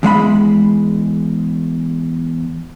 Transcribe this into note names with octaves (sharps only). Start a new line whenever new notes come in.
E2 G#3 F5 B5